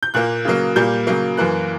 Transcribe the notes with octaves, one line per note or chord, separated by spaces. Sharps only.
G6
A#2 A#3 F#6
C#3 F#3 A#3
A#2 G3 A#3 G6
C#3 F#3 A#3
F#2 E3 A#3 F#6